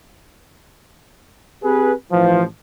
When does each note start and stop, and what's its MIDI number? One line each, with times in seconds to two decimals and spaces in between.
1.64 1.93 60
1.64 1.93 67
1.64 1.93 68
1.64 1.93 71
2.12 2.44 33
2.12 2.44 52
2.12 2.44 53